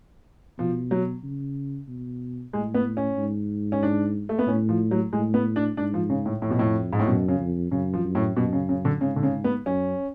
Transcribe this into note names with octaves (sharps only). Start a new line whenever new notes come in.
B2 F3
F#3
C#3
B2
A2 G#3
B3
C#4
G#2
C#4
D4
A3
B3
A2 C#4
F3
F#3
A2 G#3
B3
D4
G#2 D4
F3
C#3
A2
F2 A2
B2
A2
G#2
A2
F#2 B2
C#3
F2
F#2 C#3
F3
F#2
A2
F#2 B2
C#3
C#3
D3
G#2 C#3
D3
C#3
B3
F#2 C#4